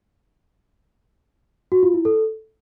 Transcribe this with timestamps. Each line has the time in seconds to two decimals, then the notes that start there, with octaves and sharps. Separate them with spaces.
1.72 F#4
1.83 F4
1.94 E4
2.05 A4